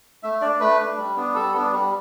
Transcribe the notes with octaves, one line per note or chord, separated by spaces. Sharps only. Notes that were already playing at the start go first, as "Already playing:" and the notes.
A3 E5
D4 D5
A3 B4
D4
G3
B3 D4
G3 A4
B3 D4
G3